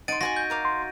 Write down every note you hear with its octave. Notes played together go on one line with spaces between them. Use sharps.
D#4 F#5 C6 A6 D7 D#7
F#4 F#5 G#5 C6 A#6
G6
A#4 F5 D6
C6